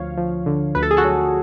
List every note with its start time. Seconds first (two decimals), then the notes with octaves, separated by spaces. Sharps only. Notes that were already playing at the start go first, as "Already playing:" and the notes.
Already playing: D2 F3 C#5 F5
0.17 F3
0.46 D3
0.75 D2 B4
0.83 A4
0.91 G#4
0.97 F#4 A4
1.05 F#3